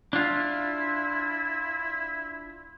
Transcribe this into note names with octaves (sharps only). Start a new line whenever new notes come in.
D4 E4 F4